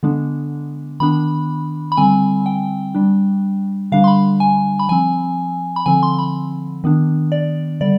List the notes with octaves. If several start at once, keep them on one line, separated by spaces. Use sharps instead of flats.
D3 G#3 B3 D4
D#3 B3 D4 B5
B5
D3 G3 C4 G#5
G5
G3 D4
D3 G3 D4 F5
C6
B5
G#5
B5
F3 C4 G#5
B5
D3 F3 C4 G#5
C6
B5
D#3 B3 D4
D5
D3 G3 D5